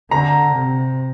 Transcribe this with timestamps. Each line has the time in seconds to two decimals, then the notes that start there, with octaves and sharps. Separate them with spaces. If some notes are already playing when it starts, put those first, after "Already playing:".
0.11 D3 A#5
0.53 C3